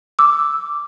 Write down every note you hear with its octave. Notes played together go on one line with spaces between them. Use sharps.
D6 E6